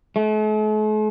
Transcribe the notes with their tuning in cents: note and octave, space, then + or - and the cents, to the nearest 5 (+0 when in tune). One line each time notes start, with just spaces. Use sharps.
A3 -45